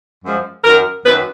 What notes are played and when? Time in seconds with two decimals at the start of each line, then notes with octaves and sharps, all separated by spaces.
0.23 F#2 F3 G#3
0.64 F#2 D#3 F#3 A#4
1.05 F#2 D#3 F#3 B4